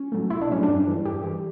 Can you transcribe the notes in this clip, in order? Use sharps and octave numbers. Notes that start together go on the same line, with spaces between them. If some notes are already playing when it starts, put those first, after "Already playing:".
Already playing: C#4
A2 F#3 A3
B1 E4
D4
A2 F#3 A3 C#4
D4
G2
E3 G3
G2 G4
E3 G3